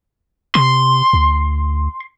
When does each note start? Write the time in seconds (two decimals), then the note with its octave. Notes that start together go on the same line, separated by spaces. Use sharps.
0.55 C3 C6
1.13 D2